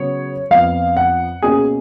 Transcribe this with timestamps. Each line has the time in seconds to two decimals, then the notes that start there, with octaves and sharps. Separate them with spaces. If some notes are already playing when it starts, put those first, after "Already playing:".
Already playing: C#3 F#3 B3 C#5
0.50 F2 F3 B3 F5
0.97 F#5
1.42 B2 A#3 C#4 G#4